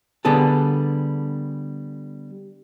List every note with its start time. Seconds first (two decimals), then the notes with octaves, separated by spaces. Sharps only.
0.25 D3 G3 B3 G#4 A4